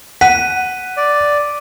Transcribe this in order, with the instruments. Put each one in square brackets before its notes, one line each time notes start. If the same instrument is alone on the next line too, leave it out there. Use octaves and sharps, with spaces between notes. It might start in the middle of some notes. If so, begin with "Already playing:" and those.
[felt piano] F#5 [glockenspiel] B6 D#7
[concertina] D5